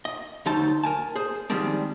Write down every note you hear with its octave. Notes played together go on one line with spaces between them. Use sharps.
D#5
D2 F#3 D#4 C5 A5
A#4 G#5 A5
G#4 C5
D#3 F3 G3 G#3 C4 D4